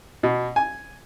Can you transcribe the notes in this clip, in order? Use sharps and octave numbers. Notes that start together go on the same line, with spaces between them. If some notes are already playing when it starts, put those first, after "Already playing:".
B2
G#5